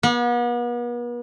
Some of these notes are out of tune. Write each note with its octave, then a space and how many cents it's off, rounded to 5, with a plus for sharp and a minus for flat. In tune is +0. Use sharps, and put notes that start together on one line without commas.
B3 -40